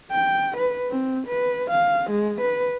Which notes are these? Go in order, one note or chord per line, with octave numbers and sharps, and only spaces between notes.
G5
B4
C4
B4
F5
G#3
B4